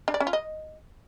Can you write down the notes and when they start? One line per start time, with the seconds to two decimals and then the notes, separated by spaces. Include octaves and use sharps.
0.08 D4
0.14 D5
0.20 C#4
0.27 F4
0.33 D#5